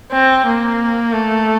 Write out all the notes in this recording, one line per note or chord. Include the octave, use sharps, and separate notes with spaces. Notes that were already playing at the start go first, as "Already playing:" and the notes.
C4
A#3
A3